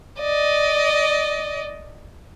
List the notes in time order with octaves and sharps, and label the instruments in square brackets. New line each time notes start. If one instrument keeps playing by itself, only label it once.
[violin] D5 D#5